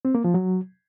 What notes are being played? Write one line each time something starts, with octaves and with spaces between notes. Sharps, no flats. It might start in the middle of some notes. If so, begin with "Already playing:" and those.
C4
A#3
F3
F#3